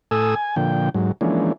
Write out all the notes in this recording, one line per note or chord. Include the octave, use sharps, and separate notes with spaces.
A2 A4 G#5 D#6 E6
G#5
A#2 D3 F3 G5
G#2 F#3
E3 F3 G#3 A#3 C#4 D4